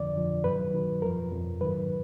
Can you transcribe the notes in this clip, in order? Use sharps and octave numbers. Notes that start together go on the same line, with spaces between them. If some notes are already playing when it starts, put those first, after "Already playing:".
Already playing: F2 D3 F3 D5
F2 D3 F3
F#2 D#3 F#3 B4
F#2 D#3 F#3
F2 F3 A#4
F2 F3
G#2 D#3 F#3 B4